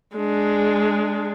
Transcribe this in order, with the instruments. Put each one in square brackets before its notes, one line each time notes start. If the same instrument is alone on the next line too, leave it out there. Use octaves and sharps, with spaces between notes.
[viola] G#3 D4